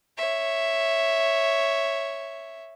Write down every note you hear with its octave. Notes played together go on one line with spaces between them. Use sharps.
C#5 E5